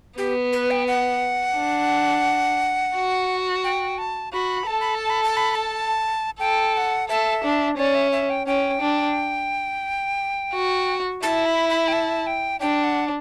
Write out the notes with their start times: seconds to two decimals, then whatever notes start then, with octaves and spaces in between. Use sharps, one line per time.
0.18 B3 G4
0.53 B4
0.71 G5
0.87 F#5
1.56 D4
2.95 F#4
3.64 G5
3.98 A5
4.33 F#4 B5
4.67 A4 A5
4.81 B5
4.95 A5
5.10 B5
5.23 A5
5.37 B5
5.51 B5
5.55 A5
6.40 A4 G5
6.74 G5
6.77 F#5
7.09 A4 E5
7.44 D4
7.77 C#4 D5
7.95 E5
8.12 E5
8.30 G5
8.46 C#4 G5
8.81 D4
10.54 F#4
11.23 E4 A5
11.46 B5
11.69 B5
11.88 G5
11.93 A5
12.27 G5
12.61 D4 G5
12.84 F#5